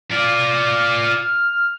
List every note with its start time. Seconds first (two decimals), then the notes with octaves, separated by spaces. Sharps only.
0.12 F4 D5
1.03 F6